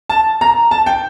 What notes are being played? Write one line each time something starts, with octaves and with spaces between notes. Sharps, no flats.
A5
A#5
A5
G5